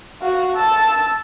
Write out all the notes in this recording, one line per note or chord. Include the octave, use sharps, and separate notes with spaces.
F#4 F5
A5 E6